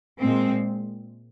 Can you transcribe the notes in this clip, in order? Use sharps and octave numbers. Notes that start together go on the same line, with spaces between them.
A#2 G#3 C4